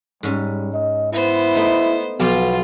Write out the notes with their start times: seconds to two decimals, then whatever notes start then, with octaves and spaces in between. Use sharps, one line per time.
0.23 G#2 G3 C#4
0.73 D#5
1.13 B3 E4 C5
1.55 A3 D#4
2.20 B1 F3 B3 F4